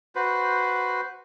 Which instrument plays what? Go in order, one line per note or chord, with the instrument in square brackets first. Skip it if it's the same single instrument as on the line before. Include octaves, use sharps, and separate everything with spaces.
[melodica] F#4 B4 C5